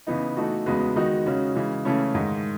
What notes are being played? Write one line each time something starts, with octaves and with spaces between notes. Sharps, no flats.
C#3 E3 B3 D#4
E3 A3 D#4 F#4
E2 C#3 G#3 B3 F#4
D#3 G#3 D#4 F#4
C#3 G#3 C#4 F#4
C#3 E3 G#3
C#3 E3 A3 C#4
G#2 D#3 G#3